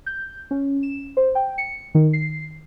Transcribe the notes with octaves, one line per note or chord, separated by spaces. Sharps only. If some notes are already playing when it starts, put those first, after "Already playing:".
G6
C#4
E7
C5
G5
C#7
D#3
C7